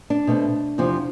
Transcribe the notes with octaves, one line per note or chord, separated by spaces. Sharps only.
D4
B2 A3 C4
E2 C3 F3 C4